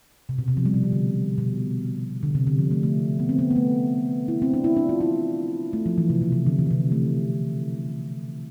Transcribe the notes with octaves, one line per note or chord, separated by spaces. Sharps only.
C3
B2
C3
F3
G3
B2
C3
D3
B2
D3
C3
D3
F3
A3
A3
B3
C4
B3
B3
A3
E4
C4
D4
E4
D4
F4
E4
A3
F3
E3
C3
B2
C3
D3
E3
B2
C3
A3